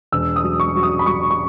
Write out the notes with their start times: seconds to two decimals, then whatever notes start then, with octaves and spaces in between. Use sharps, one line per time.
0.12 E1 E6
0.36 D#6
0.43 F#3
0.60 C#6
0.75 F#3
0.83 D#6
0.99 B5
1.06 F#3 C#6
1.31 C#6